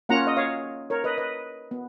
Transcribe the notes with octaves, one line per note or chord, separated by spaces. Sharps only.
A#3 C#4 F4 F#5 A#5
D#5
C#5 F5
A#4 C#5
B4 D#5
B4 D#5
B3